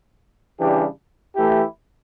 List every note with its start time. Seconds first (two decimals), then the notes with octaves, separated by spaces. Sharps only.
0.58 C#3 E3 G3 D4 G4
1.36 E3 A3 E4 G4